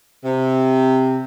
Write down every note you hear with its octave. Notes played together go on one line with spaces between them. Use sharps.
C3